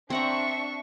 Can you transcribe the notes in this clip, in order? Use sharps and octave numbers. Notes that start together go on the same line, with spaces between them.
C4 D4 E5 F#5 A#5 C#6